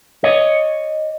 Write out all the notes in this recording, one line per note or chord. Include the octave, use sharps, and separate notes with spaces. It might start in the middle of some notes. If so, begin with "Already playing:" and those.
C#5 D#5